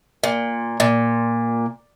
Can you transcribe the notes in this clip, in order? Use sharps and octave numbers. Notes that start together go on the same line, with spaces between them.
A#2
A#2